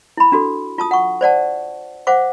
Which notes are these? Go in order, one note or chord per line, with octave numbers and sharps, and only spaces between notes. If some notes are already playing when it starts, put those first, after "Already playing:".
E4 B5
D4 F#4 A4
F4 A5 D#6
F#5 C#6
C5 D5 F#5 A5
C5 F5 F#5 D6